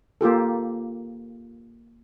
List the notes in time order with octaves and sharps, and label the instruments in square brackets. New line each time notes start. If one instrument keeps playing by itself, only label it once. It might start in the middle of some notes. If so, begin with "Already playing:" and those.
[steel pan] A#3 F4 G4 A4